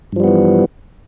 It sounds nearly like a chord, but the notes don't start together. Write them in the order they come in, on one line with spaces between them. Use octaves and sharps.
G2 F3 G3 B3 E3